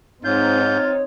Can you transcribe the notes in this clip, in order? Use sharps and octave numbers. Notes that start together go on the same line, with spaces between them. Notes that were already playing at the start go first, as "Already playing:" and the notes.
G#2 C4 D#4 F4 C#5 G6